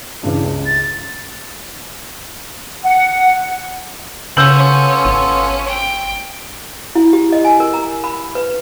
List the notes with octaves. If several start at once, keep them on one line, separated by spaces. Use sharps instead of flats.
G2 C#3 E3
C#2
A6
F#5
C#3 B3 C#4 F4 A4 E6 G6 F#7
G#1
G5
E4
G4
D#5
G#5
A#4
A#5
B5
B4